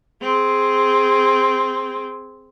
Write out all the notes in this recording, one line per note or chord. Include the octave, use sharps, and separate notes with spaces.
C4 G#4